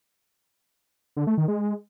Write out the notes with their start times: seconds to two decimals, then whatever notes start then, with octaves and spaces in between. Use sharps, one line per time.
1.16 D3
1.27 A3
1.38 D#3
1.48 G#3